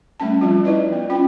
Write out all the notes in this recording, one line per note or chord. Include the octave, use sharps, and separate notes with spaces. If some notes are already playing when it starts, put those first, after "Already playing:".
G3 A3 C#4 A5
F3 G3 C4 F4
D#4 E4 B4 D5 D#5
B3
C#4 F4 G5